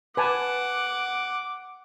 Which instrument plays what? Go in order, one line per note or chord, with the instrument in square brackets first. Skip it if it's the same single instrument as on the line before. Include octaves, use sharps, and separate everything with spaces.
[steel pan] B4 G#5 A5 [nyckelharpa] F#5 [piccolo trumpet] D6